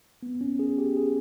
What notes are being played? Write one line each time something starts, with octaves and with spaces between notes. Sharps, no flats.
B3
C#4
G#4
G4
G#4